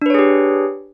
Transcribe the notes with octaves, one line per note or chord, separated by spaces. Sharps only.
D4 G4 G#4 B4 C#5